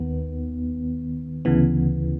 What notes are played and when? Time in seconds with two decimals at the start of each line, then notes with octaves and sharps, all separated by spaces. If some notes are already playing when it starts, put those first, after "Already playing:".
Already playing: D#2 D#3 B3
1.45 D2 C#3 E3 B3